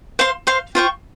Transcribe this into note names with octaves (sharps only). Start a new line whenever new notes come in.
C5 F5 C6
C5 F5 C6
F4 C5 G5 C#6